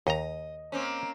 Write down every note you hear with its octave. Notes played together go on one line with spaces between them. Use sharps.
D#2 D#5 A#5
A#3 C4 C#4